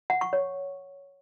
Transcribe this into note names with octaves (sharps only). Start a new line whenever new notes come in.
F#5
C#6
C#5